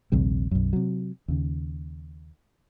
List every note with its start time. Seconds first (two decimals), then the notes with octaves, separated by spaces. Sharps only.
0.12 A#1 D#2 C3 G3
0.51 B1 F#2
0.73 C3 F#3
1.28 D#2 C#3